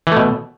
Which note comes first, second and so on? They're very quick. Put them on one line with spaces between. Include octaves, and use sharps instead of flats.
E3 A3 B2